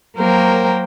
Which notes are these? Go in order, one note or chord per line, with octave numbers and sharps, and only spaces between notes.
F#3 A#3 A#4 C5 G5